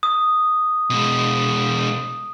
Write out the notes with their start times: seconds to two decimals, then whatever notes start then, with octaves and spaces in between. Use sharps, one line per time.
0.03 D#6
0.90 B2 G#3